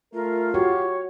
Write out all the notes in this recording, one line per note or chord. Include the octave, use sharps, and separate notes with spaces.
A3 F4 A#4
F#4 G4 C#5